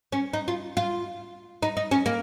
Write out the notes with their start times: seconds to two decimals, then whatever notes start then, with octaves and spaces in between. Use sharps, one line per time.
0.12 C#4
0.33 D#4
0.48 F4
0.77 F4
1.63 D#4
1.77 D#4
1.91 C#4
2.06 A#3